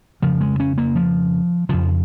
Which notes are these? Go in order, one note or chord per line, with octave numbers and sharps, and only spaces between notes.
F2 C#3 F3
G#3
C#4
A#3
F3
F2 C#3 F3